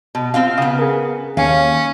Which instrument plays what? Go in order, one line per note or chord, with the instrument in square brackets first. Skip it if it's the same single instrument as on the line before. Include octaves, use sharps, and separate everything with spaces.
[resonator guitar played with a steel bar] B2
C4 F4 F5
[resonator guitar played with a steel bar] C#3 B3 [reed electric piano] F5 D#6
[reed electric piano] G#4 A#4
[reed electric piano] D#2 [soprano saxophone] C#4 [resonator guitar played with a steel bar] F5 G#5